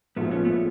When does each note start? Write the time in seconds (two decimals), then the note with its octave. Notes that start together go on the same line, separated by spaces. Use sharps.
0.16 A#1 G#2 F3 A3 B3
0.31 B3 C#4
0.45 A3 B3